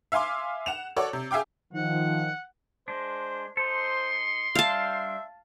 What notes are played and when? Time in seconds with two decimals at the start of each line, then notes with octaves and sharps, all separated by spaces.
0.12 E5 F5 G#5 C6 D6
0.66 F#5 E7 F7
0.96 F#4 A4 C#5 D5
1.13 C3
1.31 G#4 E5 F5 G5 D6
1.73 D#3 F3 F#5
2.88 G#3 D4 C5
3.57 D#4 A4 C5 C6
4.55 G3 D4 C5 E5 F5 A5